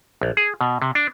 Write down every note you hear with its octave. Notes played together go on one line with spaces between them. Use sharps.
A#1
G#4
B2
C3
D4